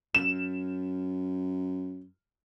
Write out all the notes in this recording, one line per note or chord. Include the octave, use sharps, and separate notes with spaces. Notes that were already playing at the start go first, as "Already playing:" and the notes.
F#2 E7